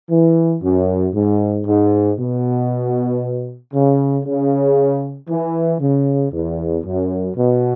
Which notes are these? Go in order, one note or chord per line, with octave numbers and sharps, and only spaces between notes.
E3
F#2
G#2
G#2
B2
C#3
C#3
E3
C#3
E2
F#2
B2